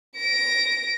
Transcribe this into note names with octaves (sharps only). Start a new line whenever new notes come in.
A#6 D7